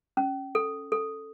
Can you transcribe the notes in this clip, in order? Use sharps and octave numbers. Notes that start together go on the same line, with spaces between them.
C#4
A4
A4